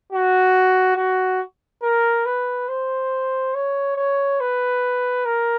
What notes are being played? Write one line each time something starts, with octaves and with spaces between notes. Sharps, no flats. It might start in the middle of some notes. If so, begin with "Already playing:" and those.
F#4
F#4
A#4
B4
C5
C#5
C#5
B4
A#4